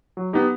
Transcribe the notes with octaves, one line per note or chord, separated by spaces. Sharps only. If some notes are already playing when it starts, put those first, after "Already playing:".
F#3
B3 D#4 G4